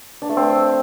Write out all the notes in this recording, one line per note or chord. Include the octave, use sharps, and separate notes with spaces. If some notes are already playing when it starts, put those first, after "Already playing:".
D4
A3
C4